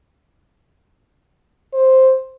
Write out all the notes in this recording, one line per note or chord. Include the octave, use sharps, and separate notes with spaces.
C5